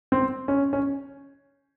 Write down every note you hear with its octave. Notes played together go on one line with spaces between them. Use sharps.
C4
C#4
C#4